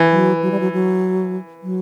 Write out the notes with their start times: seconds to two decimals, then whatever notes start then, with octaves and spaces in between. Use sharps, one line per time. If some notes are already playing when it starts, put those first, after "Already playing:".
Already playing: E3
0.11 F#3
0.42 F#3
0.51 G3
0.60 F#3
0.73 F#3
1.63 F#3